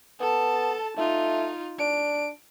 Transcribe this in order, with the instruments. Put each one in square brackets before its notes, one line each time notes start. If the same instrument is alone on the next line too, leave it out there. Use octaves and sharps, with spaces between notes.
[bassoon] B3 [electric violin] A4 A5
[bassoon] A3 [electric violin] D#4 F4
[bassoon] D4 [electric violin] D7